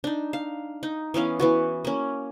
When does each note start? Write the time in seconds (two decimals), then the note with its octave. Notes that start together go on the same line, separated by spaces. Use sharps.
0.04 D4 D#4
0.33 F5
0.83 D#4
1.14 E3 B3 C#4 F5
1.39 E3 B3 F#4
1.85 A#3 C#4